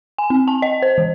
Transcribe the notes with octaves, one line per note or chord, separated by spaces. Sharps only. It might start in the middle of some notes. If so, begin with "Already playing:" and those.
G#5
C4
A5
D#5
C5
E3